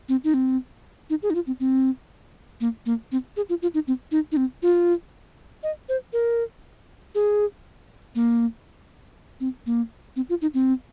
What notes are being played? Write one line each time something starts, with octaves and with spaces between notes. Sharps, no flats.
C4
D#4
C4
D#4
G#4
D#4
F4
C4
C4
A#3
A#3
C4
G#4
F4
F4
D#4
C4
D#4
D#4
C4
F4
D#5
C5
A#4
G#4
A#3
C4
A#3
C4
F4
D#4
C4